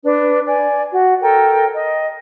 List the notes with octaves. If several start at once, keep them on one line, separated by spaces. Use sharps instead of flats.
D4 B4
D5 G#5
F#4
A4 A#4 C#5 G5
D#5